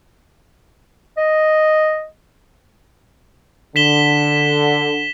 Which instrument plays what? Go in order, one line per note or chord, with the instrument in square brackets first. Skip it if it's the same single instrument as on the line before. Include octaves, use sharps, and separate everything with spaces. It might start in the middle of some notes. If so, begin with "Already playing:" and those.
[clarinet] D#5
[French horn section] D3 [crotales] B6 E7 G7